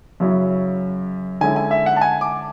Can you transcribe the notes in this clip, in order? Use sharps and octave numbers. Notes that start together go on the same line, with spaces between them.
F#2 C#3 F#3 C#4 E4
D3 G#3 C#4 E4 G#5
G#5
E5
F#5
A5
G#5
D6